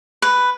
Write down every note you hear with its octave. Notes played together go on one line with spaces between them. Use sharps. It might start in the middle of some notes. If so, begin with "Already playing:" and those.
B4